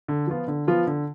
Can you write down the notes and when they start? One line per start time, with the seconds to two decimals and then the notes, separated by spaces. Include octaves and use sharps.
0.08 D3
0.27 F3 B3 F4
0.48 D3
0.67 F3 B3 F4
0.87 D3